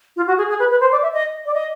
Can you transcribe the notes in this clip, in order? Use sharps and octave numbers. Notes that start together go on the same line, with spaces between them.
F4
F#4
G#4
G#4
B4
B4
C5
D5
E5
D#5
D5
D#5